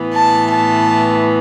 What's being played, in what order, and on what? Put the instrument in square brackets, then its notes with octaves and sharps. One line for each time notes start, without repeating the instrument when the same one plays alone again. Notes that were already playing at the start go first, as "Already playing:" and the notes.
Already playing: [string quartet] A2 E3 B3
A5
A5